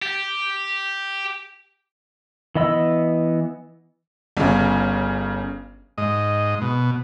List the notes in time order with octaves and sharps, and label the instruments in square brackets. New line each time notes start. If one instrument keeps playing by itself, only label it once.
[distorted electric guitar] G4
[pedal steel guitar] E3 B3 D#5 B5 E6
[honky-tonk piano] G1 C#3
[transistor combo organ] G#2 D#5
B2